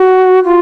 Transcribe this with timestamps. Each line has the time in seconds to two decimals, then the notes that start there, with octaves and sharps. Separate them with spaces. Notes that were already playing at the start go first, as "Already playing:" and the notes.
Already playing: F#4
0.45 F4